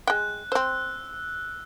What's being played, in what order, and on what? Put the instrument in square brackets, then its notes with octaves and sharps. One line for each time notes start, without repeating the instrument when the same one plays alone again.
[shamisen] G#3 G5 [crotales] F#6
[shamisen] C4 C5 [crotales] E6